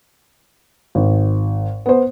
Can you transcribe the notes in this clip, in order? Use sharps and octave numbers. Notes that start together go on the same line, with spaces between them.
G#1
B3 C5